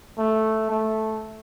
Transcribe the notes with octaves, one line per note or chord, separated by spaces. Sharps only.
A3
A3